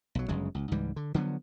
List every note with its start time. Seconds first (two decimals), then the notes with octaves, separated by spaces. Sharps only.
0.15 B1 F#3
0.28 G1 F#2 C#3 G#3
0.55 C#2
0.72 C#2 G#2 E3 G3
0.96 D3
1.14 D3 F3 F#3 B3